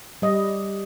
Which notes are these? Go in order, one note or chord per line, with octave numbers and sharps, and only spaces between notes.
G3 D#5